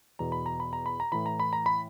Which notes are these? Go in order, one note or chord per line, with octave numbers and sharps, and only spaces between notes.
E2 B2 A#5
B5
A#5
B5
A#5
B5
A#5
A2 E3 B5
A#5
B5
A#5
B5